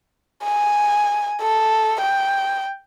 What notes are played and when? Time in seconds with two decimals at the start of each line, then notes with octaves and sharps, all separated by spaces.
0.44 G#5
1.42 A4
2.01 G5